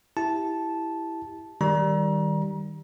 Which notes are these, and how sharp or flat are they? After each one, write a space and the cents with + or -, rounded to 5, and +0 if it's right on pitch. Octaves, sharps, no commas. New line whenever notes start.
E4 +0 G4 +0 A5 -10
D#3 +0 G3 -5 A#5 +30